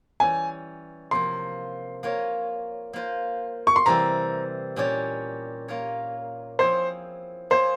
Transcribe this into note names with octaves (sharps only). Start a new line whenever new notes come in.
E3 G3 C#4 G#5
C3 F3 A#3 C6
A#3 F4 A#4 C#5
A#3 F4 C5
C#6
C6
C3 E3 G3 C4 A#5
A#2 G3 C#4 G4 C#5
A#3 F4 A#4 C#5
F3 C4 E4 G#4 C5 C#5
A#3 F4 G#4 C5 C#5